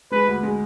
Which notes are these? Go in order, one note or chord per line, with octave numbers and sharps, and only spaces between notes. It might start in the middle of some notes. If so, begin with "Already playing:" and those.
G#3 B4
D2
G#3